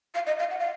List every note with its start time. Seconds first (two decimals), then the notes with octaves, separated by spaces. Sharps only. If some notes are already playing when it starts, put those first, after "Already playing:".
0.15 F5
0.27 D#5
0.39 F5
0.51 F#5
0.60 F5